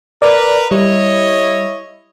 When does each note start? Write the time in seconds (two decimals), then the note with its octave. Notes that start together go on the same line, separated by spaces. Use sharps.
0.22 A#4 B4 D5
0.71 G3 E4 C#5 D#5